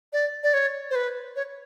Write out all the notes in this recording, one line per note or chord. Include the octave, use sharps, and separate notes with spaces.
D5
D5
C#5
C5
B4
C#5